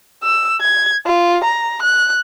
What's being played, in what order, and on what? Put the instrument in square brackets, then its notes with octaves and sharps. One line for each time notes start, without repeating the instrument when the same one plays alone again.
[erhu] E6
G#6
F4
A#5
F#6